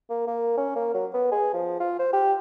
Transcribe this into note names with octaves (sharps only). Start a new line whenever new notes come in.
A#3
A#3
C#4
A#3
F#3
B3
G#4
F3
F4
C5
G4